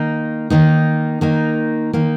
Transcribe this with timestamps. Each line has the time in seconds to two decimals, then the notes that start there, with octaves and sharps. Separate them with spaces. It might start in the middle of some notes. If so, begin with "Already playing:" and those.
Already playing: D#3 A#3 D#4
0.50 D#3 A#3 D#4
1.21 D#3 A#3 D#4
1.93 D#3 A#3 D#4